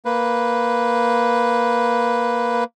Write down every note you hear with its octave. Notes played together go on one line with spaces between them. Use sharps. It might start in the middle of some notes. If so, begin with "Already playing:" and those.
A#3 B4